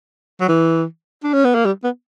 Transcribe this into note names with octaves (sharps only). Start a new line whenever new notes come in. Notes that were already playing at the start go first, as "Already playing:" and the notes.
F#3
E3
D4
C#4
B3
A#3
G3
B3